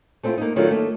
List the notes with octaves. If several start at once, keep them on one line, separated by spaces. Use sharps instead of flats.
A3 C4 D4 E4 F4
A#3 B3 D#4
D#3 F#3 A3 B3 D4 F4
A3 A#3 D#4